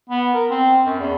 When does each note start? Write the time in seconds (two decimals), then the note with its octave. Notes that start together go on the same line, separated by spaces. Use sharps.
0.10 B3
0.34 A#4
0.50 C4
0.85 F#2
0.99 E2